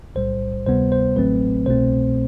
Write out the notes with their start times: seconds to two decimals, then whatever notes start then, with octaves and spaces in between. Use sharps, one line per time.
0.15 B1 A2 G3 C5
0.66 D2 C3 G3 B3 C5
0.92 C5
1.16 A1 A2 F#3 A3 C4 B4
1.66 C2 B2 A3 C4 C5